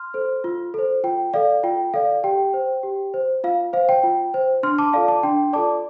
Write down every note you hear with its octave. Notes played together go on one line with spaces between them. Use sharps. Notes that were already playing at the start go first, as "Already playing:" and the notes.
Already playing: C6 F6
A4 C5
F4
A4 C5
F4 G5
A4 D5 F5
F4 G5
A4 D5 F5
G4 G5
C5
G4
C5
F4 F5
C5 F5
G5
F4
C5
D4 C6 F6
A5 D6
F4 A4 D5 F5 A5
A5 D6
D4 G5 C6
F4 A4 D5 A5 D6